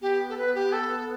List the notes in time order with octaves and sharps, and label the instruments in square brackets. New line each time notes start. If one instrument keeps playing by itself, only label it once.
[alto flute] B3 [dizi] G4
[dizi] A4
B4
G4
A4